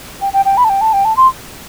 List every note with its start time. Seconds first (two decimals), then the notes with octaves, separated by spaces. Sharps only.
0.21 G5
0.33 G5
0.45 G5
0.57 B5
0.64 A5
0.69 G5
0.81 A5
0.93 G5
1.05 A5
1.17 C6